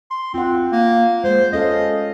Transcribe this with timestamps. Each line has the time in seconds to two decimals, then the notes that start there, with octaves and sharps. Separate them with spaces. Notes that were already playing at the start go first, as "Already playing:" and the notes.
0.11 C6
0.34 C4 F4 F#5
0.72 A#3
1.24 G#3 C5
1.53 C#4 A4 D#5 F5